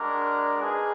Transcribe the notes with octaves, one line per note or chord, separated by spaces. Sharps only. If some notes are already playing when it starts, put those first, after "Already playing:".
Already playing: G#3 D4 F#4 A#4 D5
B3 D#4 G#4